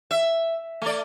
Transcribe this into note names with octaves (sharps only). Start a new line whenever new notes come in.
E5
A3 D5